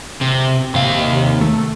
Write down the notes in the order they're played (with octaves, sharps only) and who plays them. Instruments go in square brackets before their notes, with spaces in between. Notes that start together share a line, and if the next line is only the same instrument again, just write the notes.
[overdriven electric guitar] C3
[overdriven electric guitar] D#2 F5 [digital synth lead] C3
[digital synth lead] A3